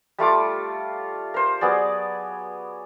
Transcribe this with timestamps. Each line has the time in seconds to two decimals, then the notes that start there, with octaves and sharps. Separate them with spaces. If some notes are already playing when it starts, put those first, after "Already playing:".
0.18 G3 A3 F4 D6
1.34 A#4 C5
1.61 F#3 B3 G#4 D5